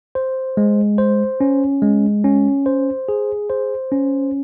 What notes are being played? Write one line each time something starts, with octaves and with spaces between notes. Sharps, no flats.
C5
G#3
C5
C#4
G#3
C#4
C5
G#4
C5
C#4